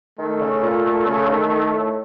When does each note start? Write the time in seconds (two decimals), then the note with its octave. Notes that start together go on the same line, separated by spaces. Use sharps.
0.18 D#3 A3
0.40 C#3
0.62 A#2
0.85 A#2
1.07 C#3
1.29 D#3
1.51 D#3
1.73 A2